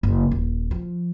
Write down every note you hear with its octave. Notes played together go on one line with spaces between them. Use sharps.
F#1
D#1
F3